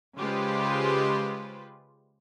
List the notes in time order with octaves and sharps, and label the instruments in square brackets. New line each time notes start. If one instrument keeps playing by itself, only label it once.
[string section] C#3 G#3 F4 G4 B4 C5